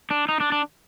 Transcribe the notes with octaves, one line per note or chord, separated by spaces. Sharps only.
D4
D#4
D4
D4